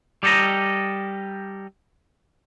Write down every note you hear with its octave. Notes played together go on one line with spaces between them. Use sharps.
G3 G4 A4 A#4 D#5